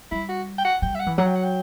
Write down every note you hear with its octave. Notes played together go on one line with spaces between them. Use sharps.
G3 E4
F#4
G5
F#5
G3 G5
E5
F#5
E3
F#3 F#5
G5
F#5
G5